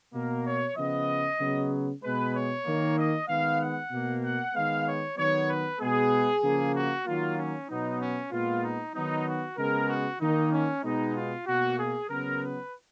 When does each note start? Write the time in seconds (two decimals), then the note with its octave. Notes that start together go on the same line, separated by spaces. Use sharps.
0.14 B2 A#3 A#4
0.46 C#5
0.76 C#3 F3 B3 D#5
1.40 C#3 F#3 B3
2.03 B2 G#3 B3 B4
2.34 C#5
2.65 D#3 A#3
2.97 D#5
3.28 D#3 G#3 B3 F5
3.60 F#5
3.91 B2 A#3
4.23 F#5
4.54 D#3 G#3 B3 F5
4.86 C#5
5.17 D#3 F#3 B3 C#5
5.48 B4
5.80 B2 G#3 B3 G#4
6.43 C#3 F3 A#3
6.74 F#4
7.06 D#3 F#3 A#3 F4
7.37 C#4
7.69 B2 F#3 B3 D#4
8.00 C#4
8.32 A#2 G#3 B3 F4
8.63 D#4
8.94 D#3 F#3 B3 D#4
9.26 F#4
9.58 C#3 G#3 B3 A#4
9.89 F#4
10.20 D#3 A#3 D#4
10.51 C#4
10.83 B2 G#3 B3 D#4
11.14 F4
11.46 B2 A#3 F#4
11.78 G#4
12.09 C#3 F#3 B3 A#4
12.41 B4